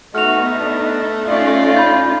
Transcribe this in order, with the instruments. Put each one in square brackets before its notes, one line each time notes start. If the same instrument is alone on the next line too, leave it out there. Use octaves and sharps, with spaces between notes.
[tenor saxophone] A3 [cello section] B3 D#4 [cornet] F#4 [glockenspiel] F6 F7
[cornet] D4
[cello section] C#4 D#4 F4 [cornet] D5
[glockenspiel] B5 G6